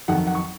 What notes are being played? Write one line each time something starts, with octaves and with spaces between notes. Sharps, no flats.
F2 D#3 F#3 F#5
F#5
C#6